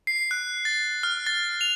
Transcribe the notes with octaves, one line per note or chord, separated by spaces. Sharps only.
C7
F#6
A6
F6
A6
F7